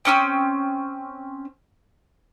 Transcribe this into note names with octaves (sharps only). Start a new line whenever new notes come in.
C4 C#4 D#6 E6